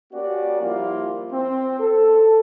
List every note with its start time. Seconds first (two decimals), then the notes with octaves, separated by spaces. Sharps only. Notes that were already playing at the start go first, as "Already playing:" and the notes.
0.13 A#3 C#4 F#4 G4 D5
0.62 F3 G3 A#3 E4 F4
1.32 C4
1.80 A4